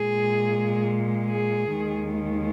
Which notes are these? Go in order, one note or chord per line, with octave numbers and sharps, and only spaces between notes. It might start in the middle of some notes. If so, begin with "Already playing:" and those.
Already playing: A#2 G#3 G#4
G#4
D#2 D#3 G#3